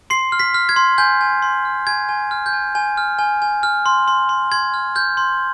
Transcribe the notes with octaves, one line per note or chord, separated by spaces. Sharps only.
C6 C7
F6
B6
F6
G#6
C6
G#5 G6
G#5
C6
F6
G#5 G#6
G#5
F6
G6
G#5
G#5
F6
G#5
G#5
F6
C6
C6
C6
C6 G#6
F6
F6 G6
C6